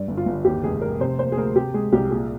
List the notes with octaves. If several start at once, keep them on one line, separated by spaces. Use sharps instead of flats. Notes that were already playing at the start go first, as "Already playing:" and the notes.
Already playing: G2 D5
G1
F4
G1
D#2 G4
F1 G#4
F1 A#4
C3 C5
A#3 C5
G#4
D2 A#4
C3 G4
G#3 G#4
C2 G4
A#2 G#4